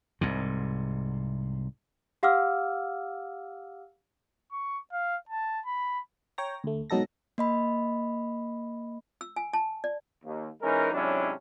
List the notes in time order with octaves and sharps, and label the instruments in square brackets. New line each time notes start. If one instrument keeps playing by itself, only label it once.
[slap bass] C2 G#2 C3
[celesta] G4 F5 F#5 D6 E6 F6
[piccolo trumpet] C#6
F5
A5
B5
[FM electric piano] C#5 G5 A#5 A#6
D2 A3
G#2 B2 F#3 D#4 A4 A#6
[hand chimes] A#3 D#5 B5
[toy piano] E6
G#5
A5
D5
[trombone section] D#2
E3 G#3 C#4 D#4 A#4
G#2 C3 F#3 C#4 D4 E4